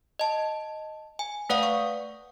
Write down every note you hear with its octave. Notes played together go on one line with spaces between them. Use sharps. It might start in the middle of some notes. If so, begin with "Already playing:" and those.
D#5 A5
G#5
A3 B4 D5 F5 F#5 D#6
C#6